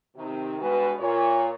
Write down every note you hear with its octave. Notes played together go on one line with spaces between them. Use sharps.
C3 D#3
G2 B2 G#3 B4
A#2 C#5